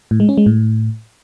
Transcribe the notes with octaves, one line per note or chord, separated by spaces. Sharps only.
A2
G#3
C#4
G#3
A2